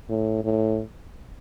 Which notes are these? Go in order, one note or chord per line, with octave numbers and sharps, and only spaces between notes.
A2
A2